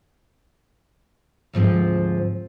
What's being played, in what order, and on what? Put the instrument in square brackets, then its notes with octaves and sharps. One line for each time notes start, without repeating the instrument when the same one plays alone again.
[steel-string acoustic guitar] D2 G#2 F3 C4